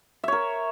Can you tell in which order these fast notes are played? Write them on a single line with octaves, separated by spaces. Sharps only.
E5 C#5 A#4